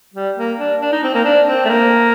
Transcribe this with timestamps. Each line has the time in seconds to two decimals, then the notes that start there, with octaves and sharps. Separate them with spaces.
0.14 G3
0.37 A#3
0.59 D4
0.82 D4
0.92 D#4
1.04 C4
1.15 A#3
1.25 D4
1.47 C4
1.65 A3
1.69 A#3